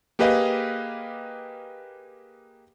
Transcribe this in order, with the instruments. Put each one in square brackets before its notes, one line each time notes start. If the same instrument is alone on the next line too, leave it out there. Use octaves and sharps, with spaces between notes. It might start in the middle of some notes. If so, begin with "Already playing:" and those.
[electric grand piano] A#3 G4 G#4 B4 D#5 F5